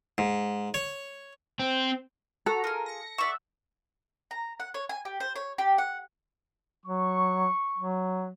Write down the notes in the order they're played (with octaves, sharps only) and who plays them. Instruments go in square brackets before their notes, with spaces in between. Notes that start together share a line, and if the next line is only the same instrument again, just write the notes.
[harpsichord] G#2
C#5
[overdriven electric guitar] C4
[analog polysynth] F#4 A#5 [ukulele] A4
[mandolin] F4 G#4 [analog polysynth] A#4
[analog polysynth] A#6 C#7
[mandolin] D5 C#6 [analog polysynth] E5 F#5
[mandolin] A#5
F#5
C#5
G#5
G4
C5
C#5
G4
F#5
[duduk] F#3 [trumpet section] C#6
[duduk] F#3